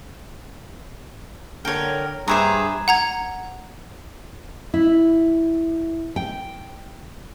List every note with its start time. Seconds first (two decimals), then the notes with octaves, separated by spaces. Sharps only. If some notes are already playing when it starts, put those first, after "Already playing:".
1.65 D3 A#4 C#5 G5
2.28 G2 G#4 C5 E5 A#5
2.88 F#5 A#5 G#6
4.74 E4
6.16 G5